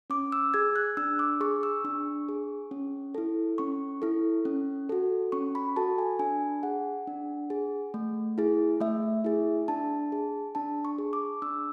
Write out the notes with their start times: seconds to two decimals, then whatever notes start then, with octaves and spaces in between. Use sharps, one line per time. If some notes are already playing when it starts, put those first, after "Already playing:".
0.10 C#4 D6
0.32 E6
0.54 G#4 G#6
0.76 F#6
0.97 D4 E6
1.19 D6
1.41 G#4 C#6
1.63 E6
1.85 D4 C#6
2.29 G#4
2.71 C#4
3.15 E4 A4
3.58 C#4 C#6
4.02 E4 A4
4.45 C#4
4.89 F#4 A4
5.32 C#4 C#6
5.55 B5
5.76 F#4 A4 A5
5.98 G#5
6.19 D4 G#5
6.63 G#4 F#5
7.07 D4
7.50 G#4
7.94 A3
8.38 E4 G#4
8.80 A3 E5
9.24 E4 G#4
9.68 D4 A5
10.12 G#4
10.55 D4 A5
10.85 C#6
10.98 G#4
11.13 D6
11.42 D4 E6